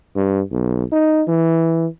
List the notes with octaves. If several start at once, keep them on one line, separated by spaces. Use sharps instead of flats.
G2
B1
D#4
E3